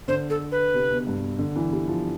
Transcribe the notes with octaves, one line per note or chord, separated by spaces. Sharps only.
D3 C5
A4
B4
C3
B2
G2
D3
E3
G3
F3